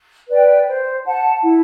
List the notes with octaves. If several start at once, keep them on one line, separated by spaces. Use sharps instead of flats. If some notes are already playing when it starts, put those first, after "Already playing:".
B4 D5 G5
C5
F#5 A5
E4